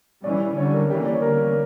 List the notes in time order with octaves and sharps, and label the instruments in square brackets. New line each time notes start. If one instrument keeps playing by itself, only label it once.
[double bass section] E3 G3 C#4 [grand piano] D5
[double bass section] D3 G3 C#4 [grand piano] C#5
[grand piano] A#4
[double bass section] E3 G3 A#3 C#4 [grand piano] G4
[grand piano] D5
C#5
[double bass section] D3 G3 A#3 C#4 [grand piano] A#4